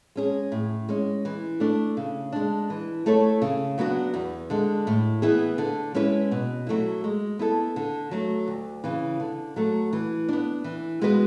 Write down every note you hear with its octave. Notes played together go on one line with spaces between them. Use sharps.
G#3 C#4 G#4
A2
G#3 C#4
E3
A3 D4
C#3
G#3 D4
E3
A3 E4 A4 C#5
C#3
F#3 B3 D4 F#4
E2
D3 G#3
A2
E3 B3 E4 G#4
D3
G#3 C#4 E4 B4
B2
F#3 A3 E4
G#3
B3 E4 A4
D3
F#3 A3
D2
C#3 E3
D3
F#3 A3
E3
B3 D4
E3
G#3 B3 F#4 B4